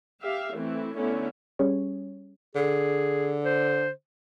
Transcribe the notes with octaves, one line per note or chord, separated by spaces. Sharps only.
G4 E5 F5
E3 A3 C4 E4
D3 A3 B3 C#4 E4
G3 C#4 G#4 C#5
D3 G#4
C5